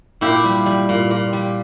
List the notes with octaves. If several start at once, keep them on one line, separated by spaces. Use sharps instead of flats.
A#2 E4 G4
G3
G3
A#2
A#2
G3